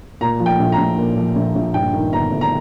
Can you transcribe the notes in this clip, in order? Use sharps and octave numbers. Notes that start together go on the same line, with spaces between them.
A#2 A#5
F3
G5
A#1
A#5
A#1
A#2
F3
A#1
A#1
G2 G5
D#3
G1 A#5
G1
A#5